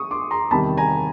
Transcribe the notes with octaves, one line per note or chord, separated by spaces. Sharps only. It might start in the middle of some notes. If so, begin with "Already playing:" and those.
Already playing: C#6 D#6
C6 D6
A#5 C6
E2 C3 D#3 G3 A5 B5
G#5 A#5